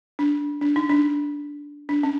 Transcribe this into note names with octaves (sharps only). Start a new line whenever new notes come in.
D4
D4
D#4
D4
D4
C#4